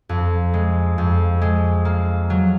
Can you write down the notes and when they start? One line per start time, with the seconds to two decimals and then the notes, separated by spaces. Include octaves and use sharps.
0.09 F2
0.54 G#3
0.98 F2
1.42 G#3
1.85 A#3
2.30 F#3